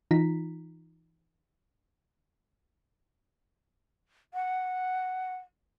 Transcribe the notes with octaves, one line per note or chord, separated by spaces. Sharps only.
E3 D#4 F4 A#5 B6
F#5